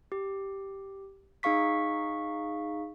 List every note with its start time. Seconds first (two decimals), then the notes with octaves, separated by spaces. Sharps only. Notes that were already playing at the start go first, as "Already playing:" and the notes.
0.12 G4
1.43 D#4 G#4 F5 C#6 B6